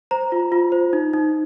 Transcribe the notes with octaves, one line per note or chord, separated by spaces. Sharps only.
C5 A#5
F4
F4
C5
D#4
D#4